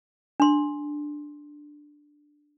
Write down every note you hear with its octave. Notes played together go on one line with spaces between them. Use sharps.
D4 C6